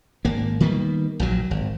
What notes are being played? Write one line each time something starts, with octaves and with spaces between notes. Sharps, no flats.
G#1 A#3
D#3 G3 A#3 B3
A#1 A#2 F#3
G#1